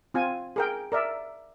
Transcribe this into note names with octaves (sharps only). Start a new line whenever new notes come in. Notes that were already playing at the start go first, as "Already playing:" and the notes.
C4 F4 G#5
G#4 A#4 G5
A#4 D5 E5